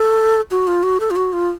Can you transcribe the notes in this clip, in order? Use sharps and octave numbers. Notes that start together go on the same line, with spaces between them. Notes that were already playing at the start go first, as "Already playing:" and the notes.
Already playing: A4
F#4
F4
F#4
A4
F4
F#4
F4